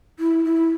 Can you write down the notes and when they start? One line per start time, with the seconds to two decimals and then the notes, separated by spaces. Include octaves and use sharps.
0.19 E4
0.45 E4